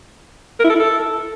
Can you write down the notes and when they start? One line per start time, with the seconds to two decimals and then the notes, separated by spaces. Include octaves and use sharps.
0.60 A#4
0.65 E4
0.70 A4
0.75 E4
0.80 A4